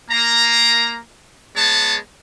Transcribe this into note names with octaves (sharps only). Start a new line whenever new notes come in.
A#3 A#5
G#3 B3 C#5 A5